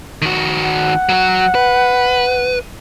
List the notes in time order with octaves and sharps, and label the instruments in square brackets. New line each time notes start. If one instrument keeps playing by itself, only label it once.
[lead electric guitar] D#3 F#4
[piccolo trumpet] F#5
[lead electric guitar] F#3 F#4
B4